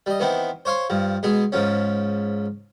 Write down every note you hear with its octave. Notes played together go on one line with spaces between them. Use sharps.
G3 D#5
D#3 E3 B3 C4
C5 C#5 F5 C6
G2 F3
B2 G#3 G#4
G#2 F3 C#4